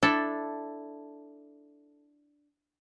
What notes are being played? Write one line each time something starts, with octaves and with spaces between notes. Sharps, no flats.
D4 E4 A4